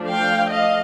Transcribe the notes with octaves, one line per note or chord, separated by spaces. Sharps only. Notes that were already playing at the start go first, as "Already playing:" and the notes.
Already playing: F3 A3 D4
F5 G5
D#5 F5